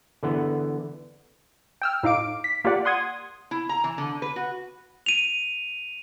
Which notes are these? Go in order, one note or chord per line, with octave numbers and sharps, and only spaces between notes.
D3 E3 B3
G5 E6 F6
A2 D#4 F5 D6 D7
B6
A#3 F4 G4 D5 F#5
F#5 C6 D#6 G#6
E4
A#5
E3
D3
B4
F#4
D#7 F7